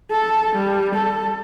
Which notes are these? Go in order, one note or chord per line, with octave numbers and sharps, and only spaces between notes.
A4
G3
A4